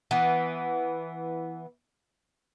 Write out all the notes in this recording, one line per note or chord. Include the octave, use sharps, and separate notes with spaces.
E3 B3